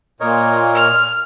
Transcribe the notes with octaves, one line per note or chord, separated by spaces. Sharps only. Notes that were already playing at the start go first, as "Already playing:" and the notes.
A#2 A#4 C#5 D#5
F6